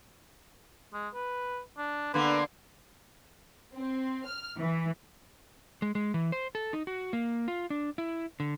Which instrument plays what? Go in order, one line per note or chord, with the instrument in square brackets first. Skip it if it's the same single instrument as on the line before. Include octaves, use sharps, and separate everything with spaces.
[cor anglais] G#3
B4
D4
[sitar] D3 A#3 B3 [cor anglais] B4
[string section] C4
F6
E3
[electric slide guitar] G#3
G#3
E3
C5
A4
D#4
F#4
A#3
F4
D4
E4
D3